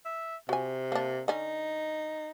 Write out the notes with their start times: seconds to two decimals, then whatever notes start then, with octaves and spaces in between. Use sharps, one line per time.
0.06 E5
0.49 C3 F#4 G#5
0.92 A#3 D4
1.28 D3 C#4 D#4